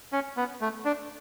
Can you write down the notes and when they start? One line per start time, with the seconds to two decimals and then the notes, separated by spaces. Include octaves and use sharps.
0.12 C#4
0.37 B3
0.61 A3
0.85 D4